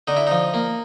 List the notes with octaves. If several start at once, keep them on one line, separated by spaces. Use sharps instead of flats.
D3 D#4
E4
F3 D#4
A#3